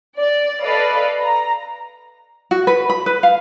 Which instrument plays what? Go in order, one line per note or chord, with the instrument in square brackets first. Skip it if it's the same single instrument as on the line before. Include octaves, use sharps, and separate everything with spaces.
[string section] D5
A4 B4 D5 D#5 F5 B5
A#5
[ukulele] F#4
B4
B5
B4
F5